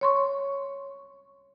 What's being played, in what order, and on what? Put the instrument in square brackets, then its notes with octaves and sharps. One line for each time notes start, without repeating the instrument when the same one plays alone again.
[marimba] C#5 C6 C#6